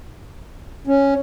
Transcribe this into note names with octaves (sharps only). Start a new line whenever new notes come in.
C#4